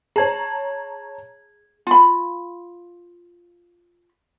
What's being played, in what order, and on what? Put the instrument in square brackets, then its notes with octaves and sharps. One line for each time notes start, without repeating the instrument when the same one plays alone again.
[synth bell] G#4 G#6 [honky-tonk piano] C#5 A5 A#5
[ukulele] F4 B5